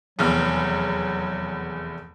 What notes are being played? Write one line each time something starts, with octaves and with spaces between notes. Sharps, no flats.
F1 E2 F#3 F6